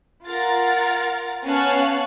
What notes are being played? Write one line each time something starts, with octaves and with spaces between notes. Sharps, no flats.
F4 A#4 F#5 A6
B3 C#4 C#5 F5 A5 F#6